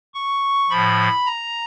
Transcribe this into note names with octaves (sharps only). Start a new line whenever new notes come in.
C#6
A2 F3 B5
A#5